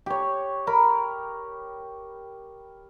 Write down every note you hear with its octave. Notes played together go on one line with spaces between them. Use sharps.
G4 C#5
A#4 B5